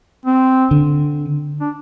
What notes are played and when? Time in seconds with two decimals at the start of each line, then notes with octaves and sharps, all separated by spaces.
0.26 C4
0.71 D3
1.61 D4